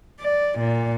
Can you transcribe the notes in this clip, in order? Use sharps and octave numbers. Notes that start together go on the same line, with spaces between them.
D5
A#2